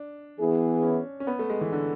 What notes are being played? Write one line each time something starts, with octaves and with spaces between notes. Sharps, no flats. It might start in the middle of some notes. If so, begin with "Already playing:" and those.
Already playing: D4
E3 B3 E4 G#4
C#4
C#4
B3
A3
G#3
E3
D3